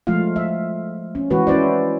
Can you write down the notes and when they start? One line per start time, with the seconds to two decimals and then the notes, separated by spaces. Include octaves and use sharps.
0.07 F3 G#3 A3 F4 F5
0.36 E5
1.15 C#4
1.30 E3 G#3 F#4 B4
1.47 C#4 E4 B4 C5 D5